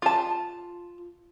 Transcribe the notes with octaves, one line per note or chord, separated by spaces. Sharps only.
F4 A5